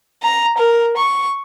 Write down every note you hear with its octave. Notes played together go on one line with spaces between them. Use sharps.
A#5
A#4
C#6